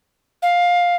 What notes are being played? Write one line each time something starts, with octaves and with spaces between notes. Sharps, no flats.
F5